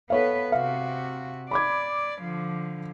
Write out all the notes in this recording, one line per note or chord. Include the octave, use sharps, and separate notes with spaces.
B3 A4 B4 C#5 F5
C3 F#4 F5
D5 B5 D6 G#6
D3 F3